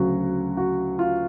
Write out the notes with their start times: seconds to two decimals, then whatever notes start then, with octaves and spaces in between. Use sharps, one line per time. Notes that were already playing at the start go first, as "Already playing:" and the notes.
Already playing: D2 C#3 F#3 F#4
0.57 F#4
0.99 F4